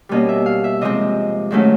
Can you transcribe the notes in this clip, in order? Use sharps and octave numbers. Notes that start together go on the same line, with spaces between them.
B2 G3 A#3 C#4 D#5
E5
F5
E5
C3 F3 G#3 C4 D#5
G#2 D#3 F#3 A3 C#4